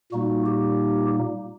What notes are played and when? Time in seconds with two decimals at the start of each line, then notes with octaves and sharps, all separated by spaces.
0.12 A#2 G3 A#3 D#4 F#4
0.46 G4